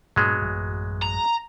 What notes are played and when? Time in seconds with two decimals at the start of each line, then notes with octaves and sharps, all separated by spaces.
0.16 G2 A#2 F#3 G#3 B3 D4
0.42 A1 F#2
1.03 A#5